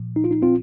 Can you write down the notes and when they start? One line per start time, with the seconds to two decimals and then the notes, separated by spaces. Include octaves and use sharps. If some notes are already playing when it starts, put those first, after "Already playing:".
Already playing: A#2 F3
0.16 D#4
0.24 F4
0.31 D#4
0.42 C4 F4